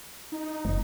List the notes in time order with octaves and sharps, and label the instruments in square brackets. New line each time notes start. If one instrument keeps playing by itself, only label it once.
[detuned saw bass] D#4
[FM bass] F#1